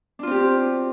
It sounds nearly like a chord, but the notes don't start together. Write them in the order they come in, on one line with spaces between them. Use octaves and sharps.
D4 F4 C4 G4